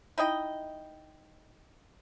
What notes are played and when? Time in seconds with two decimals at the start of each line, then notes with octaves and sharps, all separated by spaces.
0.18 D#4 E4 D#5 G5